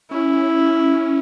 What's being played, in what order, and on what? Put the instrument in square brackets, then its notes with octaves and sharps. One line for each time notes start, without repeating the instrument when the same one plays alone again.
[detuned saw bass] C#4 [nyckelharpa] E4